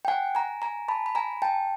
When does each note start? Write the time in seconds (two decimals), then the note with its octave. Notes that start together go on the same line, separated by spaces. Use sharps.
0.05 G5
0.08 F#5 G#5
0.35 G#5 A#5
0.62 G#5 A#5
0.88 A5 B5
1.06 B5
1.15 G#5 A#5
1.42 G5 A5